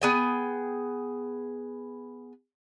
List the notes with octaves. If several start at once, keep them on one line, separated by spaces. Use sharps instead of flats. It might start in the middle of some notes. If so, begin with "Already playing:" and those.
B3 G#4 G5